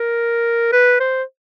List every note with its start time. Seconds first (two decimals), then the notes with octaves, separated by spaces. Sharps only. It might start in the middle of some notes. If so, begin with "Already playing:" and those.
Already playing: A#4
0.72 B4
1.00 C5